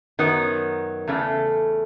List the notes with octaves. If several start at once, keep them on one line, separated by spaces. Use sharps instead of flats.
F#2 D#3 F#3 B3
E2 C#3 A3